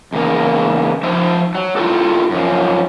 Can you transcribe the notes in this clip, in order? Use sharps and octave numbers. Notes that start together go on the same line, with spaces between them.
E2 C#3 A#3
F3 C5 E5
F#3
E4 F4 G4 A4
F#2 F3